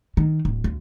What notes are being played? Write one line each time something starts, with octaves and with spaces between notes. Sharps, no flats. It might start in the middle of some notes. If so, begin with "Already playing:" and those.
D#3
D1
D2